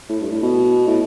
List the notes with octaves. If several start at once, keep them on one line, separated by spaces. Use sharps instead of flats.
A2
G2
A2
B2
A2